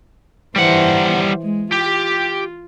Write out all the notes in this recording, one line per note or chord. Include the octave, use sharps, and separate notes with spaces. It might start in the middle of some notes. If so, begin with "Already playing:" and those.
E3 G3 C5 F#5
G#3
F4 G4